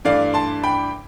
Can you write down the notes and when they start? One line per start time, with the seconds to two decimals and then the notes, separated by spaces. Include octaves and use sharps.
0.05 G2 E3 A3 D4 D5 F5
0.34 A5 C6
0.63 G5 B5